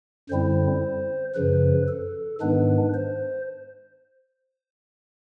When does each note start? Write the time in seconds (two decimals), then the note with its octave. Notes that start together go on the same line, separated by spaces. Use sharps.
0.29 F#2 D3 G3 C4 E4 C5
1.35 F#2 C#3 F3 B4
1.88 A4
2.40 G#2 D#3 G#3 B3 D4 B4
2.94 C5